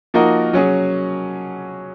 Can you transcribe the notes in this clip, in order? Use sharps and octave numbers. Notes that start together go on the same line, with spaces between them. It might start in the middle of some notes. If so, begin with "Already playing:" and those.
F3 A#3 D#4 F#4 A#4
F#3 C#4 G#4